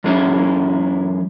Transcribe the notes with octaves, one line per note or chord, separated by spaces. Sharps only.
F#2 E3 G#3 C#4 E4